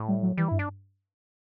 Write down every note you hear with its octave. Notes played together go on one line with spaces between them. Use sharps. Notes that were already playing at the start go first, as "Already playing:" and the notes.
Already playing: A2
G3
F#3
E3 G3
G2 E4
D4